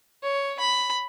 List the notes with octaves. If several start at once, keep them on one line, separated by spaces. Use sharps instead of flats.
C#5
B5